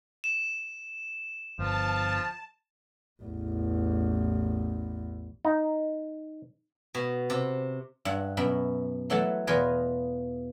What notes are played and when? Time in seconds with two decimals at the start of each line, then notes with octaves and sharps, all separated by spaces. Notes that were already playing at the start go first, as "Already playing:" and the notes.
0.24 E7
1.59 G1 F3 A5
3.22 A1 E2
5.45 D#4
6.95 B2
7.30 C3
8.05 G2 E5 F#5
8.37 F#2 B2 E5 B5
9.10 E3 F#3 A3 E5 F#5 A5
9.47 E2 B2 F4 B4 D#5 G#5